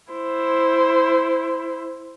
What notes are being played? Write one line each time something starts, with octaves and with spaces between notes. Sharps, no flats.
E4 C5